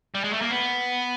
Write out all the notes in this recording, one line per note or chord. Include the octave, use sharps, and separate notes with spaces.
G3
G#3
A3
A#3
B3